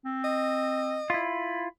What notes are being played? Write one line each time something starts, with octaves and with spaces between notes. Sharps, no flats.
C4
D#5
E4 F4 B5